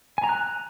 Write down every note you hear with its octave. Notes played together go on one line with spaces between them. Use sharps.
G#5
A#5
F#6